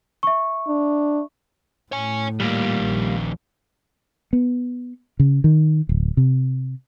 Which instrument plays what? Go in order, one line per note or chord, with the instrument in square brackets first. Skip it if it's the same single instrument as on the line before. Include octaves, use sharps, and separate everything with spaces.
[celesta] E5 C#6
[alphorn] D4
[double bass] A2 [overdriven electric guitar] C#5 G#5
[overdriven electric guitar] D#2 A#2 [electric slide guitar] G3 A#3
[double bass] A#1
[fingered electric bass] B3
C#3
D#3
D1
C3